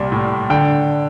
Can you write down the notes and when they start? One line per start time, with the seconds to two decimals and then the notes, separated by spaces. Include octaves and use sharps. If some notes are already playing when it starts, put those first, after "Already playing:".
Already playing: C2 A#2 G3
0.12 A2
0.50 D3 G5